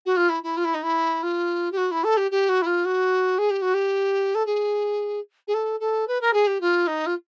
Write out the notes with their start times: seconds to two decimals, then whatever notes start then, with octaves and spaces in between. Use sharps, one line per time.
0.05 F#4
0.16 F4
0.29 E4
0.43 E4
0.56 F4
0.64 E4
0.74 D#4
0.83 E4
1.22 F4
1.71 G4
1.77 F#4
1.91 E4
2.03 A4
2.16 G4
2.31 G4
2.48 F#4
2.61 E4
2.66 F4
2.85 F#4
3.38 G#4
3.50 G4
3.61 F#4
3.73 G4
4.34 A4
4.46 G#4
5.47 G#4
5.54 A4
5.80 A4
6.07 B4
6.21 A#4
6.33 G#4
6.46 G4
6.60 F4
6.87 D#4
7.06 F4